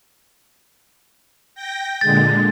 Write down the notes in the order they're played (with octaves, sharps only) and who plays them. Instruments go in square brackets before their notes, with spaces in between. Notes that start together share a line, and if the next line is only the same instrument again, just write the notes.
[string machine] G5 G6 A#6
[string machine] A#2 D3 G#3 [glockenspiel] A6